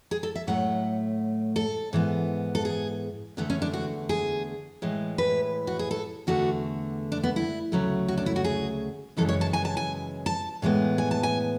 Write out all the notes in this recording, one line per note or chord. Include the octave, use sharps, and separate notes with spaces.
G#4
A4
E5
A2 F#3 A3 F#5
A4
G#2 E3 B3
A4
G#4
E2 D3 A3 B3
C#4
D4
F#4
G#4
A2 E3 G#3
B4
F#4
G#4
A4
E2 D3 A3 F#4
D4
B3
E4
D2 C#3 F#3 A3
F#4
D4
E4
F#4
G#4
F#2 C#3 E3 G#3 A4
C#5
A5
G#5
A5
G#5
A5
A2 E3 G#3 B3
G#5
A5
G#5